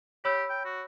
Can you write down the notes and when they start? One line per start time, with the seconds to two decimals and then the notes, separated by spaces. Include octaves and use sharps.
0.25 G4 C#5 B5 E6
0.50 G5
0.65 F#4